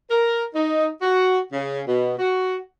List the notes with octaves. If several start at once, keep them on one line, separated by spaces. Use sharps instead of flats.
A#4
D#4
F#4
C#3
B2
F#4